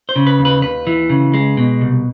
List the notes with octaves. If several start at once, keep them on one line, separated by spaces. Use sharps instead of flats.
C5
C#3
B4
D#2
B4
D#2 B4
E3
C#3
G#3
B2
C2